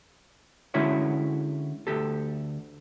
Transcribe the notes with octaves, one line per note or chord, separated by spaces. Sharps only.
D3 G#3 C#4 E4 F#4 C#5
D2 G4 A4